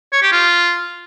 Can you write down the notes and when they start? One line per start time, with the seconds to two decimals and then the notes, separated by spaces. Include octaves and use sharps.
0.13 C#5
0.22 G4
0.32 F4